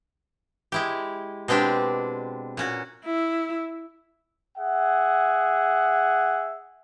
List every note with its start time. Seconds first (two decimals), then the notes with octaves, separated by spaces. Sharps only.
0.72 G#3 E4 G4
1.48 B2 G#3 C4 D4 G4
2.57 A#2 C#4 F#4
3.06 E4
4.58 G#4 E5 F#5